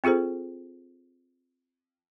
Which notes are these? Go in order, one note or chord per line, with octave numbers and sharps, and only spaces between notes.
C4 F4 G#4 A4 C5